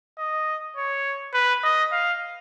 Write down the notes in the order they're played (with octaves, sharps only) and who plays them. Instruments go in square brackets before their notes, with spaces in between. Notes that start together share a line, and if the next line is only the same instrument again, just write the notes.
[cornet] D#5
C#5
B4
D#5
F5